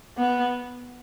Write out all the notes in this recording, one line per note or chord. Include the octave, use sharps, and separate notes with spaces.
B3